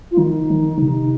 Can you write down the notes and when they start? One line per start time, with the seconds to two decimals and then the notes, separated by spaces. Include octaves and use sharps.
0.11 F4
0.17 D#3 D#4
0.50 D#3
0.78 D3
0.82 C3 D#4